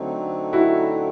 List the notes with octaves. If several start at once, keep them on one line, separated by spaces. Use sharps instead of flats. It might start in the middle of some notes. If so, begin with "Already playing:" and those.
Already playing: D3 F#3 A3 C4 D#4
E4 F#4